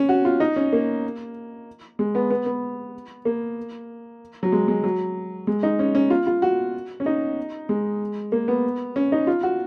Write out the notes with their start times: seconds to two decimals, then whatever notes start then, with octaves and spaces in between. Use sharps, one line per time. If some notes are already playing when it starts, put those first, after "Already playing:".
Already playing: C#4
0.09 F#4
0.25 F4
0.40 D#4
0.56 C#4
0.73 A#3
1.99 G#3
2.15 B3
2.30 B3
2.46 B3
3.25 A#3
4.43 F#3
4.52 G#3
4.68 G#3
4.84 F#3
5.47 G#3
5.63 D#4
5.79 C#4
5.95 C#4
6.10 F4
6.27 F4
6.42 F#4
7.00 C#4
7.06 D#4
7.69 G#3
8.32 A#3
8.48 B3
8.96 C#4
9.12 D#4
9.27 F4
9.43 F#4